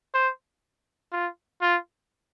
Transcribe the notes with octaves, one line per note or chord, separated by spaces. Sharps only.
C5
F4
F4